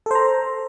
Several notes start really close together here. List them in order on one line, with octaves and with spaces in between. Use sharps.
A4 C5 A#5